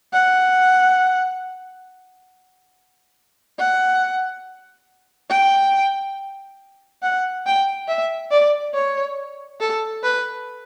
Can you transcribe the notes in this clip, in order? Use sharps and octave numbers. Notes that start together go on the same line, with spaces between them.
F#5
F#5
G5
F#5
G5
E5
D5
C#5
A4
B4